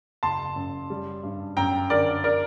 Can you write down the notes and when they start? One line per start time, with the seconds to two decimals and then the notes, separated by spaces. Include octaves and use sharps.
0.23 F#1 A5 C6
0.56 F#2
0.90 G3
1.23 G2
1.57 F#2 G5 A#5
1.90 D3 A#4 D5
2.24 A#4 D5